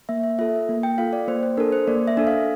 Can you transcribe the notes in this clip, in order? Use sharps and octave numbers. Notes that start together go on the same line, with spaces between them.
A#3 E5
E5
F4 A4 E5
A#3
G5
F4 A4 F5
D5
A#3 C5
C5
D4 A4 A#4
C5
A#3 D5
E5
D4 A4
F5